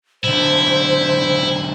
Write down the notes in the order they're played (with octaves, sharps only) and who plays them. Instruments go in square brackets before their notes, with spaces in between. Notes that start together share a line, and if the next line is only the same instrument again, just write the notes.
[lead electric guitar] B1 D3 [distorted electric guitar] E4 [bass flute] C5